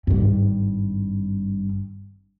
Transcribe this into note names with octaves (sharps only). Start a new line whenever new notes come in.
G#1 G2